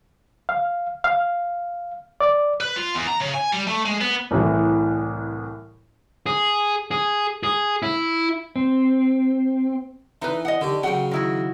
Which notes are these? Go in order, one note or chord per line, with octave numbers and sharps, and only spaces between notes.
F5
F5
D5
B4
F4
E2
A#5
C#3
G#5
G3
A3
G#3
B3
C2 A2 E3
G#4
G#4
G#4
E4
C4
E3 D#4 B4
D#5 F#5
D3 D#3 G4
C#3 F#3 F#5 G5
D#3 E4 F#4